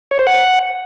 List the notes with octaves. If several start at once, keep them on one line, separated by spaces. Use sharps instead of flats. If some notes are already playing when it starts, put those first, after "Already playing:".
C#5
C5
F#5